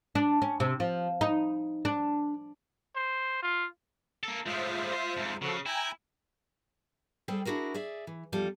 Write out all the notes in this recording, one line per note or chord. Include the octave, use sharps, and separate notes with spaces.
D4
C#4
C3
F3
D#4
D4
C5
F4
A#3 A4
A2 G#3 F4 C5 E5
D#5 C6
F2 G#2
C#3 F3 F#4 A4
E4 G5 G#5 A#5
G3 G#4 A4 C5 G5
D4 E4 F#4 G#4 A#4
G#4 D5 E5
E3
E2 F3 G3 A4